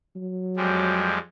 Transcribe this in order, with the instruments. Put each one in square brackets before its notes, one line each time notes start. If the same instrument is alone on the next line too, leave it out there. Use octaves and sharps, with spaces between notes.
[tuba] F#3
[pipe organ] F2 G3 G#3